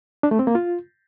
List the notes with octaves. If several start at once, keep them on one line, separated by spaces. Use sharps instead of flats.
D4
A3
C4
A#3
F4